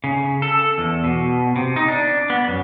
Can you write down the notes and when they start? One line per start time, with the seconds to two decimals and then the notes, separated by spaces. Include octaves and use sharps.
0.04 C#3
0.42 A4
0.78 E2
1.04 B2
1.56 C3
1.76 D#4
1.88 D4
2.30 B3
2.48 F#2